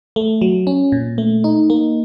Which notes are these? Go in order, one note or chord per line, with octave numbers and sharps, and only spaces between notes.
A3
F#3
C#4
A#2
A3
D#4
A#3